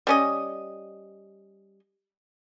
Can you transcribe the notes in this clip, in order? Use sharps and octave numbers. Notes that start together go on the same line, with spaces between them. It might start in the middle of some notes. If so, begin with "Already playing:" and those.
G3 C#4 D#5